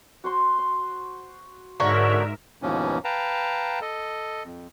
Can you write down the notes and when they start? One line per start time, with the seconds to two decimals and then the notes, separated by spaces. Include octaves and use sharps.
0.24 F#4 C5 C6
0.58 C6
1.80 G#2 D3 F#4 A#4 C#5 E5 A#5 E6
2.62 D#2 G#2 B2 E3 F3 C#4
3.04 B4 F5 G5 A5 A#5
3.81 A4 D#5
4.44 F2